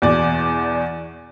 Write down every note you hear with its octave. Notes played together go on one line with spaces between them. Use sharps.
E2 B2 D5